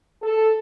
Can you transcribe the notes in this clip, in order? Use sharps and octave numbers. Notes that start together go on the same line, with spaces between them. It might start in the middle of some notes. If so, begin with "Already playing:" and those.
A4